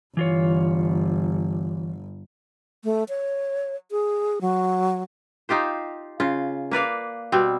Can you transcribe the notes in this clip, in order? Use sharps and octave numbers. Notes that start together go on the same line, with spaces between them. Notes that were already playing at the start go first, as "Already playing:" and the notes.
G1 E3 F4 C#5
A3
C#5
G#4
F#3
D#4 F4 G4 C5
C#3 F4
A#3 B4 D5 F5
B2 G3 C4